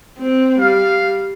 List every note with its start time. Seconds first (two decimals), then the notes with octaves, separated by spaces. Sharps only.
0.19 C4
0.59 G3 F5